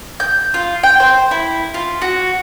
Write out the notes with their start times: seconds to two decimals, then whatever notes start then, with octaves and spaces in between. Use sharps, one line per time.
0.20 G6
0.54 F4
0.83 G5
1.00 C5
1.31 E4
1.74 F4
2.02 F#4